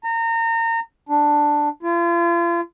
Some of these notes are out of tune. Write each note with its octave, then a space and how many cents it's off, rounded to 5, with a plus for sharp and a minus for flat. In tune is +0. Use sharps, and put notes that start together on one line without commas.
A#5 -30
D4 +5
F4 -40